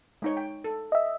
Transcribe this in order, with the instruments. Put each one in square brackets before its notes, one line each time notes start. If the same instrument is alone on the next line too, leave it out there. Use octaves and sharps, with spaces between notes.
[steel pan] G#3 D#4 C#5
G5
A4
[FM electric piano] D#5 E5